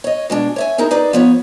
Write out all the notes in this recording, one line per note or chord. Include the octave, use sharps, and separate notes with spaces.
C#5 D#5
B2 G#3 D4
C#5 E5 G#5
D#4 E4 G#4 A#4
D#4 G#4 B4 D5
F3 B3 C#5